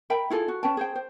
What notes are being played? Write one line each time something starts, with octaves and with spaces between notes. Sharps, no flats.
A#4 E5 G5 B5
E4 F4 G#4 A4
F#4
C#4 B4 G5 A5
G#4 C5 G5
C5